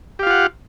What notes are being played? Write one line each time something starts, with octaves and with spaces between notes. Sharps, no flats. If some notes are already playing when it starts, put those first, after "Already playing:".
F4 G4 F5 F#5